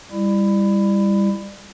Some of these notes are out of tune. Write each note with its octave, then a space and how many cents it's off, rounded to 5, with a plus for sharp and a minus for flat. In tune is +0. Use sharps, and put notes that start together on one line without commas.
G3 +20 E4 +15